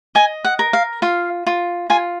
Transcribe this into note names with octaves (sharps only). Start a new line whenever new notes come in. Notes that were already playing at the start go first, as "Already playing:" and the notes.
D#5 G#5
F#5
A#4
F5
F4 F5
F4
F4 G#5